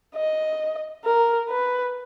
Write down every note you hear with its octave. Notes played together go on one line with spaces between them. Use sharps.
D#5
A#4
B4